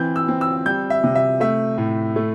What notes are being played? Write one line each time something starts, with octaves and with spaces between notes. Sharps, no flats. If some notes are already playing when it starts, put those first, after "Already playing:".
Already playing: E3 C4 G6
E6
C4
E6
G3 G6
E5
C3
E5
A3 E5
A2
A3